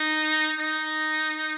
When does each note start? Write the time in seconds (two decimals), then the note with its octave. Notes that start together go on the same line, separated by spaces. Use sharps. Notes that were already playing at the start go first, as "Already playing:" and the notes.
Already playing: D#4
0.57 D#4